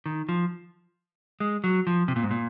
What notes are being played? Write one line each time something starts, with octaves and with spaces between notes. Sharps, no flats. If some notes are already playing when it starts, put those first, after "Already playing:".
D#3
F3
G#3
F#3
F3
C3
A#2
G#2
A#2